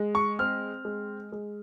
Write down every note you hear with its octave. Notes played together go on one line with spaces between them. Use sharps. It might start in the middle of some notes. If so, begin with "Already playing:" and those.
Already playing: G#3
C#6
C4 F6
G#3
G#3